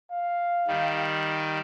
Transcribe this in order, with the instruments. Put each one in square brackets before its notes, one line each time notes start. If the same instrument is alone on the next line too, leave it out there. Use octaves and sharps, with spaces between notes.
[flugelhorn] F5
[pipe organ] D#3 G3